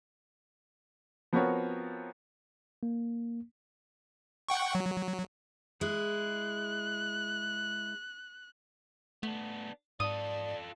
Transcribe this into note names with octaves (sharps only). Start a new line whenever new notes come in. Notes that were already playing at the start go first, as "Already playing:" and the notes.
F3 B3 C4 F#4 A#4 C#5
A#3
F#5 G5 C#6
F#3
G#3 E4 F#6
A3 B3 D4
G#2 F4 A4 D5 D#6